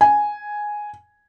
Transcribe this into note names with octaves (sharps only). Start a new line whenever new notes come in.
G#5